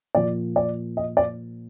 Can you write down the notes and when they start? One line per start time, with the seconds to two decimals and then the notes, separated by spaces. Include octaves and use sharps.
0.15 A#2 F3 D5
0.56 D5
0.97 D#5
1.17 D5